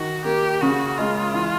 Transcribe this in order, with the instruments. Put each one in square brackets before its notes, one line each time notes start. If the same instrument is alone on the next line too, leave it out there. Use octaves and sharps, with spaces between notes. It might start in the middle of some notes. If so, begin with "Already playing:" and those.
Already playing: [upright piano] D#3 [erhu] F#4
[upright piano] A#3 [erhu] G4
[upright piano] C#3 [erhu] F#4
[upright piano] G#3 [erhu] F4
[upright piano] E3